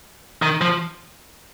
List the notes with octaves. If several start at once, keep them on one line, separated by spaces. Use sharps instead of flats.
D#3
F3